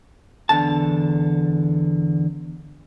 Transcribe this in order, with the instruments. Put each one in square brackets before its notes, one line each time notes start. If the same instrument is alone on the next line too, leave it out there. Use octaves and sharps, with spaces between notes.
[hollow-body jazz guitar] E2 D3 A5